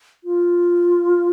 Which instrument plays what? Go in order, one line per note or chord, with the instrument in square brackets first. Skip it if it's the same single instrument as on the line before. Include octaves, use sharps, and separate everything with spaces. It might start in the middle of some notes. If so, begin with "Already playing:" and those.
[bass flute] F4